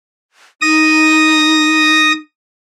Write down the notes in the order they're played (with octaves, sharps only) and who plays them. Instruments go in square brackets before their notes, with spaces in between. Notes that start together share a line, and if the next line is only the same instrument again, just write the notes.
[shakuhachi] D#4 [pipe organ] D#6 A#6